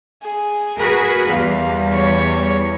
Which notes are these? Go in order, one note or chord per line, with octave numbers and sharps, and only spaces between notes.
G#4
F#4 G#4 A#4 B4
E2 G3 F5
C#5